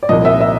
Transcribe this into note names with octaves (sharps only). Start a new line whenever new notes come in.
D5
C2 A#2 F3 D#5
E5
E5